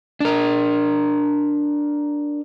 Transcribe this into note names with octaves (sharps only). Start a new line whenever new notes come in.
D4 A#4